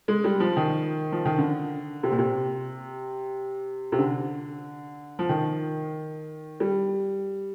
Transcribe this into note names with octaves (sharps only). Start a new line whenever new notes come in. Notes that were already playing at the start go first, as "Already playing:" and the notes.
G#3
G3
F3
D#3
F3
D#3
D3
C3
A#2
C3
C3
D3
F3
D#3
G3